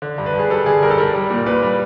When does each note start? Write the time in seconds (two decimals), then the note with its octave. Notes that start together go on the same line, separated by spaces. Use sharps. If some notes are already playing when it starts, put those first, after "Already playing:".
0.02 D3
0.18 G2
0.26 B4
0.34 G2
0.39 G#4
0.50 G3 A4
0.66 D3 G#4
0.83 G2 A#4
0.91 A4
0.98 G3 A#4
1.14 G3
1.30 A#2
1.46 A#2 B4
1.63 G3